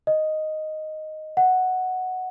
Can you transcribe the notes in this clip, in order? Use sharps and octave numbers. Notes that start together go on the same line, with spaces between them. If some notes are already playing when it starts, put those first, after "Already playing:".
D#5
F#5